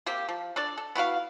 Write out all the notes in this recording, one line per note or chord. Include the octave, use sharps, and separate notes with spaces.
A#3 C4 G4
F3
D4 A4 D5
A4
B3 E4 F#4 F5